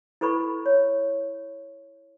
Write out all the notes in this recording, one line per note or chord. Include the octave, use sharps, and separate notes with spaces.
E4 A4 B4 B5 C#6
C#5